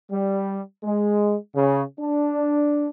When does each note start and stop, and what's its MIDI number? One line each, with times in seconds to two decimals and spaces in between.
0.10 0.59 55
0.83 1.35 56
1.55 1.82 49
1.99 2.86 62